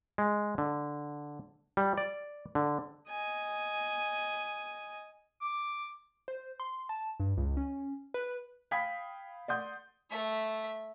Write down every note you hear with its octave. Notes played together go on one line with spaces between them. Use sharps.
G#3
D3
G3
D5
D3
D#5 G#5
D6
C5
C6
A5
G2
C#2
C#4
B4
F5 G5 B5 D#6 G#6 B6
D5 F#5 C6 D#6 G6
A3 E5